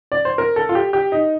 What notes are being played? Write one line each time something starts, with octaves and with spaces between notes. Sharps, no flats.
D5
C5
A#4
A4
F4
G4
G4
D#4